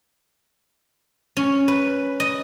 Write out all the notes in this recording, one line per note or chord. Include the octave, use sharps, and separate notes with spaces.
C#4
B4
D#5